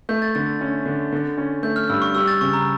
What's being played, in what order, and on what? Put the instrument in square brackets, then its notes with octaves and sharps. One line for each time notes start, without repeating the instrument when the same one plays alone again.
[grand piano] A3 [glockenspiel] G6
[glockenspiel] A6
[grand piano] D3 [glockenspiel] A6
[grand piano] C#4
D3
D3
C#4
[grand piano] A3 [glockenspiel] G6
[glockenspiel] F6
[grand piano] G2 [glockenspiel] E6
[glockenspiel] C#6
[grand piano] G3 [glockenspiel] E6
[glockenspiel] A6
[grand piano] C#3 [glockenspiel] C#6
[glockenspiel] A#5